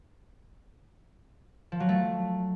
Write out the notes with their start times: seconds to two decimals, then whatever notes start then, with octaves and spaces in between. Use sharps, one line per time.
1.72 F3
1.80 F#3
1.89 A3